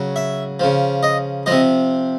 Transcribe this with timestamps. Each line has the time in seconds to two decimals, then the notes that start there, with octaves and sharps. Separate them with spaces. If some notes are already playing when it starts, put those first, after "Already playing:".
Already playing: C#3 F#3
0.16 E5
0.60 C#3 F3
1.03 D#5
1.46 C3 F3 D#5